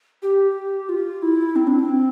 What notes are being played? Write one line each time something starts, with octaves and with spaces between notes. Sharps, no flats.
G4
F4
E4
C4
D4
C4